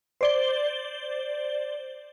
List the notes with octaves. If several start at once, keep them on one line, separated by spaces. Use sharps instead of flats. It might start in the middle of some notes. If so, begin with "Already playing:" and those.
C5 D5 G7